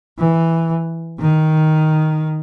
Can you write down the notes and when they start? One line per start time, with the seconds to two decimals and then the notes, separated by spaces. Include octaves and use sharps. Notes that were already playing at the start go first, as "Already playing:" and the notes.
0.19 E3
1.20 D#3